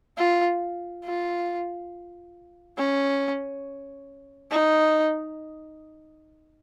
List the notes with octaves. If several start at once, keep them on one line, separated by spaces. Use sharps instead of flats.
F4
F4
C#4
D#4